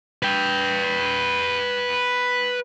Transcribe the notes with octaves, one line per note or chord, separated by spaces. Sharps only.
B4 G5